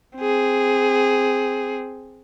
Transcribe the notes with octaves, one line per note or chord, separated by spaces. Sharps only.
C4 G#4